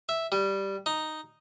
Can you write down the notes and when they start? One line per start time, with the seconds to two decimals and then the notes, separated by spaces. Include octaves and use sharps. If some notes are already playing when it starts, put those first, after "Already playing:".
0.09 E5
0.32 G3
0.86 D#4